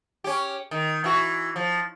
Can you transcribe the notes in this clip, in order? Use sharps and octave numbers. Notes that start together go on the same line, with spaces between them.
C#4 G4
D#3
E3 F#4
F3